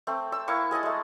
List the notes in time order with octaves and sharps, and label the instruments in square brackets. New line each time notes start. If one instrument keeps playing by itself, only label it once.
[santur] A3 C4
E6
A#3 E4 C#6
G#4 D#5 G#5 A5
G#3 A3